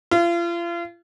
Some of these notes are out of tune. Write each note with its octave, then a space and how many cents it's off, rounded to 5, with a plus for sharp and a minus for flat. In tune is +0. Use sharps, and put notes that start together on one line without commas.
F4 -35